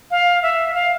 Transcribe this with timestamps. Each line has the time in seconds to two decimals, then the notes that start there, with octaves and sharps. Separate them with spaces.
0.11 F5
0.42 E5
0.74 F5